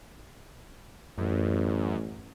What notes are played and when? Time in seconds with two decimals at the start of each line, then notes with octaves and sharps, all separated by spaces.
1.18 A1 F#2